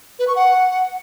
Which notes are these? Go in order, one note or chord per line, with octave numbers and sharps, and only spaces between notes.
B4
C#6
F#5